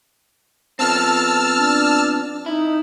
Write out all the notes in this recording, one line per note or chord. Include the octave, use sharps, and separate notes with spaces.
F3 B3 C4 A5 E6 F6
D4
D#4 E4